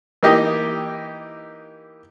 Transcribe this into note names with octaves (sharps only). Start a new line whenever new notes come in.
E3 A#3 D#4 G4 D#5